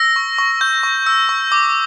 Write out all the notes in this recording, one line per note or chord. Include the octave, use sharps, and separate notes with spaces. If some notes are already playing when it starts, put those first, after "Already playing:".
Already playing: E6 A#6
C#6
C#6
C#6 G6
C#6
E6
C#6
D6